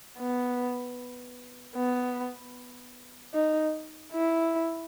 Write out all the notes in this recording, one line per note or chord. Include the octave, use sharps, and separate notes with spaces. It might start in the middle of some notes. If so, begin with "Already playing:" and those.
B3
B3
D#4
E4